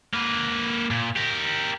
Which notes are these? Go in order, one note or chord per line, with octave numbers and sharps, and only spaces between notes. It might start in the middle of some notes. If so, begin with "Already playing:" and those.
A#3 B4
A#2
G4 A#4